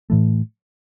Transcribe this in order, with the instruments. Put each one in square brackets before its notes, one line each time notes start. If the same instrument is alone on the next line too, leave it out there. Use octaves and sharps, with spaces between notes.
[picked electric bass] A2 E3 A3